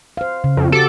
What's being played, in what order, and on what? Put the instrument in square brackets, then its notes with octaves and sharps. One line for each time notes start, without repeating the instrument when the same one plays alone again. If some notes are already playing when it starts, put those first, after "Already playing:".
[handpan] C5 F5
C#3
[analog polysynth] F2
[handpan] F#4 G4 [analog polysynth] A4 D6